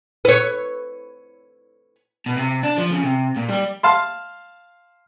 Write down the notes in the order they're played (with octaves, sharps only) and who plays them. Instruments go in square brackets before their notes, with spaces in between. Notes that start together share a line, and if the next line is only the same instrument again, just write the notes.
[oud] B4 C#5
[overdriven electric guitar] B2
C3
D4
F3
C#3
C3
A#2
G3
[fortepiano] F5 A5 C6